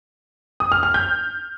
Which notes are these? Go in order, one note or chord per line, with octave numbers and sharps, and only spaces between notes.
D#6
F6
F6
G6